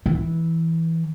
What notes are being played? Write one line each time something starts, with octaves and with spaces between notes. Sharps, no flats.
E3